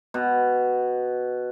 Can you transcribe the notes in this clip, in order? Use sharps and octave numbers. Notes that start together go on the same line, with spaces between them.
B2